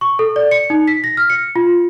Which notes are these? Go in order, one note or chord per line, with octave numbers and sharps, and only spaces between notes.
C#6
A4
D5
C#7
D#4
B6
A#6
F6
C#7
F4